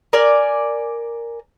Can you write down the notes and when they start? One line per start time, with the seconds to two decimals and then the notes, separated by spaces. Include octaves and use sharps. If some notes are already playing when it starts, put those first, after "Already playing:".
0.13 A#4 D5 G#5